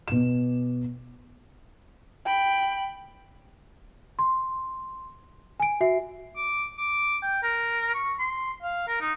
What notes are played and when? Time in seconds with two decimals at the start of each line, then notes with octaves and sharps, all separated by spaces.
0.08 B2 E7
2.26 G5 B5
4.19 C6
5.60 G#5 D7
5.81 F#4 E5 C7
6.36 D6
6.78 D6
7.22 G5
7.43 A#4
7.94 C#6
8.19 C6
8.63 F5
8.88 A#4
9.01 D#4